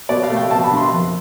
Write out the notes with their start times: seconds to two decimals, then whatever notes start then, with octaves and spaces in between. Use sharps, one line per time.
0.09 B2 D5
0.23 F5
0.30 A3
0.36 G5
0.51 B2 A5
0.64 B5
0.71 D4
0.77 C6
0.92 F2